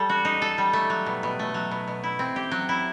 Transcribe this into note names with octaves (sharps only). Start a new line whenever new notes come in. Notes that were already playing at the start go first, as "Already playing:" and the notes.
Already playing: G3 A4
F#4
D#4
A4
G3
A3
F#3
B2
B2
A3
F#3
B2
B2
E4
C4
G4
F#3
E4